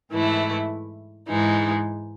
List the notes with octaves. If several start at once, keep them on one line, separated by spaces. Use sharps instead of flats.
G#2 E3 A3 E4
G#2 E3 G#3 D#4